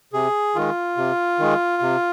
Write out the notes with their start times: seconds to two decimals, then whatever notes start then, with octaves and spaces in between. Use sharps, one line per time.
0.13 C3 G#4
0.55 D#3 G#3 F4
0.97 C3
1.39 D#3 G#3
1.82 C3